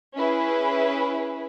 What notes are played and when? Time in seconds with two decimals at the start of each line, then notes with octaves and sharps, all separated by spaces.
0.16 C#4 E4 G#4 B4